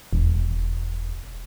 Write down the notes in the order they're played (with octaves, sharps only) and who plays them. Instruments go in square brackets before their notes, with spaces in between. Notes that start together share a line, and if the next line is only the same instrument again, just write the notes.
[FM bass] E1